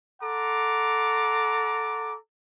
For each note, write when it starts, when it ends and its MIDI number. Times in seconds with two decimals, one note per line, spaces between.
0.21 2.15 69
0.21 2.15 78
0.21 2.15 82
0.21 2.15 84
0.21 2.15 86